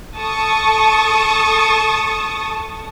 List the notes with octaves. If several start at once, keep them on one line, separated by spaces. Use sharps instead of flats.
A4 A5 C#6 D#6